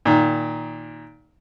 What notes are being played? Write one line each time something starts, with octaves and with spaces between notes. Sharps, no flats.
A#2 D#3